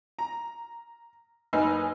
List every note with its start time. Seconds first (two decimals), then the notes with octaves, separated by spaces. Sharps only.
0.19 A#5
1.53 F#1 D#4 B4 G#5 E6